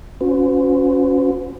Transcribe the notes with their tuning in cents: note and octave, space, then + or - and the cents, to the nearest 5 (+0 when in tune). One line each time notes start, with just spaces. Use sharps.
C#4 +0 F#4 -40 B4 +45